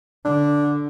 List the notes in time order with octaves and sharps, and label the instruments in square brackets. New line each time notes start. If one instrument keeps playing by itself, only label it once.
[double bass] D3 [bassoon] D4